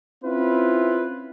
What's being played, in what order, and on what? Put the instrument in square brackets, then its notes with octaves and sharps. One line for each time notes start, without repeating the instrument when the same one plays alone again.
[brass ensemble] C4 C#4 E4 F4 B4